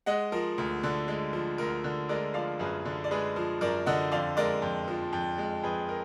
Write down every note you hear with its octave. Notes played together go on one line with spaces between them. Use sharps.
G#3 D#5 F#5
F3 A#4
D2
D3
G#3
F3
D2 A#4
D3
G#3 A#4 D5
F3 D5 F5
F#2 G#4 B4
D3
D5
G#3 G#4 B4
F3
F#2 A#4 D5
D3 D#5 F#5
F2 D5 F5
G#3 A#4 D5
F2
F3
F2
G#3
F2 G#4 B4
A#4